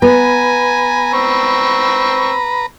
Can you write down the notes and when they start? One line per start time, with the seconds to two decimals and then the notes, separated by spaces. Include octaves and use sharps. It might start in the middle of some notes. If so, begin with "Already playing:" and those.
0.02 B3 B4 G#5 A#5
1.13 C4 C#6 E6